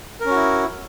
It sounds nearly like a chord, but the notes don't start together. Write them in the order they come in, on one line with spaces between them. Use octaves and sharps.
A#4 C#4 F#4 E4